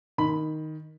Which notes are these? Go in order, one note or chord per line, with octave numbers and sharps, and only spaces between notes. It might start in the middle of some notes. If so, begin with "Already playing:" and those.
D#3 B5